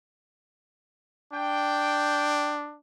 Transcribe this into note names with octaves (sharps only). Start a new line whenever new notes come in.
D4 G5